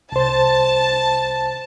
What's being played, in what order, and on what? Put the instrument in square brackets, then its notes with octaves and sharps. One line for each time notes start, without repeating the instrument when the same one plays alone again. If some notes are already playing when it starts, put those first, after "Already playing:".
[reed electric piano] C2 C5 [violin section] A5